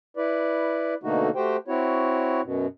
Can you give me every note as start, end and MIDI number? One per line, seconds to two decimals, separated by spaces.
0.17 0.94 64
0.17 0.94 71
0.17 0.94 74
1.03 1.30 47
1.03 1.30 50
1.03 1.30 57
1.03 1.30 58
1.03 1.30 63
1.03 1.30 66
1.35 1.57 57
1.35 1.57 66
1.35 1.57 67
1.35 1.57 72
1.35 1.57 79
1.68 2.41 60
1.68 2.41 64
1.68 2.41 66
1.68 2.41 73
2.43 2.67 42
2.43 2.67 47